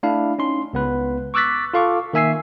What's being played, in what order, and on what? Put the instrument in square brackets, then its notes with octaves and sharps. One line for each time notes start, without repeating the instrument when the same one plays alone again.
[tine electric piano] A3 D4 E4 F5
C#4 D#4 C6
C#2 B3 B4
C#6 D6 E6 F#6 A6 B6
F4 A4 F5 C#6 D6
D#3 A#3 E5 G#5 E6 C7